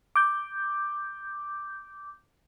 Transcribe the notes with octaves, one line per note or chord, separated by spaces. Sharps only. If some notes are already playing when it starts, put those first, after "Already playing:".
D6 G6